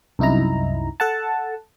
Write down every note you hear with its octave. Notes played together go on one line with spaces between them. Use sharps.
C2 F#2 D#4 E4 A#5
A4 F#5 A5